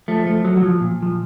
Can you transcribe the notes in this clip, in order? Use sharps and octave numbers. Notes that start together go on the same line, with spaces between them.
F3 A3
A3
F3 F#3
F#3
F3
A#2
F3